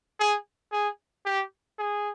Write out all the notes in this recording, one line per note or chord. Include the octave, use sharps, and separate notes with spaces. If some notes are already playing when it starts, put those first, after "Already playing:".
G#4
G#4
G4
G#4